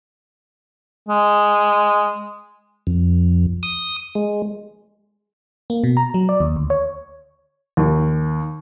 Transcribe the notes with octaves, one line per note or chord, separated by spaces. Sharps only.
G#3
F2
D#6
G#3
A#3
B2
A#5
F#3
D5
D#2
D2
C#5
D#2